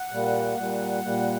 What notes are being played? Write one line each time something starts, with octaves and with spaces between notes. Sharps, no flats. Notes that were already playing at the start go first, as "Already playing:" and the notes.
Already playing: F#5
A#2 G3 A#3
A#2 G3 A#3
A#2 G3 A#3